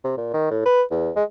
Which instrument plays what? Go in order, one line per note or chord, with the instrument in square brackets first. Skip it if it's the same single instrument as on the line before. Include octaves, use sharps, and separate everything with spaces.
[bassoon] C3
A#2
D#3
A2
B4
E2
G#3